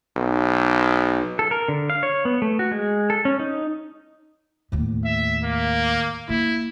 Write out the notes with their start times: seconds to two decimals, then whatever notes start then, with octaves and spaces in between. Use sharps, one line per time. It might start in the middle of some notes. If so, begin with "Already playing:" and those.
0.17 B1
1.39 A4
1.51 A#4
1.68 D3
1.90 F5
2.03 C#5
2.25 B3
2.42 A3
2.59 F#4
2.72 G#3
3.10 A4
3.25 C#4
3.40 D#4
4.72 D#2 A2
5.05 E5
5.44 A#3
6.29 A#3 E4